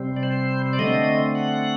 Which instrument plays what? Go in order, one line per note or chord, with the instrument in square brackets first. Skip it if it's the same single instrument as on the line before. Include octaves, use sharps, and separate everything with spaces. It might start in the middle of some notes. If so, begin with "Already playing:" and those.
Already playing: [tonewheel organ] C3 G3 C4
D5
C5
D5
D3 A3 C4 D#5
F#5